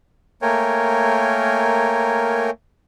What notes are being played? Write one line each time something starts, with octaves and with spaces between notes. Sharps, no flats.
A3 A#3 A#4 C#5 G5 G#5